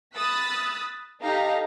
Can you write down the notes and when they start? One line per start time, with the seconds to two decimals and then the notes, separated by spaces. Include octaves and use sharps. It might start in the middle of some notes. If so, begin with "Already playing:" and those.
0.16 B5 D#6 E6 F#6 A6 B6
1.21 D#4 G4 A4 D#5 F5 A#5